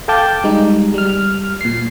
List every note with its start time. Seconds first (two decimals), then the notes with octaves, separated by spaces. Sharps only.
0.08 A4 F5 G5 A5 D6 G6
0.44 G3 G#3 D#4
0.94 G3 F6
1.61 A#2 C7